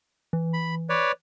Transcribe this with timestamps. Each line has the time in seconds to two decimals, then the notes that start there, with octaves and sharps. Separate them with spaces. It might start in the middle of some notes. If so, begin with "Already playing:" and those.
0.33 E3
0.53 B5
0.89 B4 C#5 D5